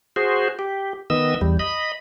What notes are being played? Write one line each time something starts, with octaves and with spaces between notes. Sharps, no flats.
F#4 G#4 C5
G4
D#3 B3 D#5 E6
E2 G3
D#5 B5